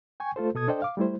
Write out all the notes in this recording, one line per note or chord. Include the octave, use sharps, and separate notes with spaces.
G5 G#5 C#6
A3 F4 A4 C5
B2 A4 D#6 G#6
D4 A4 C5 D5 D#5 G5
F5 D6
G3 A3 E4 C5